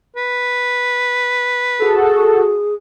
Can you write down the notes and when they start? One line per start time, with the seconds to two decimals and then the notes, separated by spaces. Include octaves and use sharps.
0.17 B4
1.80 F#4 G#4 A4